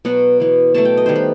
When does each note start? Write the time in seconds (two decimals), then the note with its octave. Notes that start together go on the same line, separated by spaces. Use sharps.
0.05 B2 F#3 B3 F#5
0.40 E3 B3
0.74 B2 F#3 A3 A5
0.85 G5
0.97 D#5
1.06 D#3 G3 B3 C5
1.15 B4